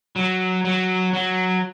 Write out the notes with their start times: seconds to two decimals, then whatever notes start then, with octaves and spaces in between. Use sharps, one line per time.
0.16 F#3
0.65 F#3
1.13 F#3